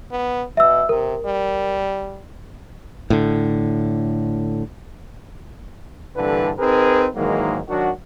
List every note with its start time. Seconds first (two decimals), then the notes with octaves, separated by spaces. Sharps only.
0.11 B3
0.57 B2 E5 E6
0.89 C3 A#4
1.25 G3
3.10 A2 D3
6.16 C2 G2 D3 E3 A4 B4
6.59 C4 D#4 G#4 A#4 B4
7.15 G#2 D#3 E3 F#3 G#3 A#3
7.68 D#3 F#3 D4 F#4